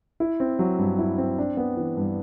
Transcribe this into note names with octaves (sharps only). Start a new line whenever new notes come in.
E4
C4
F#3
G2
E4
C4
D4
B3
E3
G2